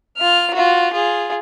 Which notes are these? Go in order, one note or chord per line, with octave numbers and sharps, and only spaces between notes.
F4 F6
F4 F#4
F4 G#4